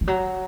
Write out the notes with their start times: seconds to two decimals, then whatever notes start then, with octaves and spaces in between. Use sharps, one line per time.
0.01 E3
0.07 F#3